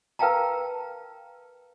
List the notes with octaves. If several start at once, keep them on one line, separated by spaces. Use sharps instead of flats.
A#4 B4 F5 G5 A5 A#5